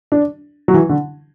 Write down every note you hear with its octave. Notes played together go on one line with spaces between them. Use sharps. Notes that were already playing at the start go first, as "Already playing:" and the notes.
D4
F#3
E3
D3